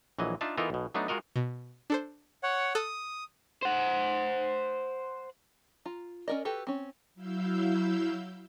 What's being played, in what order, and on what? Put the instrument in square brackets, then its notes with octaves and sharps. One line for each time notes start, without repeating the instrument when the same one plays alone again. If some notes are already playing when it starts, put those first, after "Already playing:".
[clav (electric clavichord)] A#1 E3 F#3 D#5
D4 D#4 F4 E5 A5
E3 B3 D#4 F4 A4 A#4
B1 B2
F#3 A3 B3 D4 D#4
G#3 F4 F#4 A#4 D#5
[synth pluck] B2
D4 A4 C5
[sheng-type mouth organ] C#5 F#5
[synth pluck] A4 F#6 [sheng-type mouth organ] D#6
[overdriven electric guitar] C5 F#5
[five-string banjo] F4 A#5
C#4 D#4 A#4 D5 D#5
F#4 G4 A4 B4
C4 C#4
[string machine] F#3 E4 F5 E6 G6